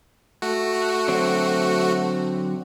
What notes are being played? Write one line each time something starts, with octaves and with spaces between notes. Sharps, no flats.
A3 F#4
D3 F#3 C4